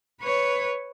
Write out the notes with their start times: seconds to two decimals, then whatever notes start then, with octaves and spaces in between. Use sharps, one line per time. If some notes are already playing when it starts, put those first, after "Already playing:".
0.22 B4 C#5